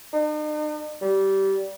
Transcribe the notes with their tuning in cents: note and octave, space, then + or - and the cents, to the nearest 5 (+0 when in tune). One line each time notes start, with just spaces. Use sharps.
D#4 -45
G3 -20